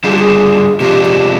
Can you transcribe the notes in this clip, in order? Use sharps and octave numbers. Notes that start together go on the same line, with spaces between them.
D3 G3 D4 F4 G#4
G4
G#4
C3 F3 G#3 D4 F4 G4
G4